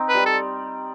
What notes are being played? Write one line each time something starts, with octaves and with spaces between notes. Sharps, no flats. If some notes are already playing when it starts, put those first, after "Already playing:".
Already playing: C4 D#4
B4
G3
A4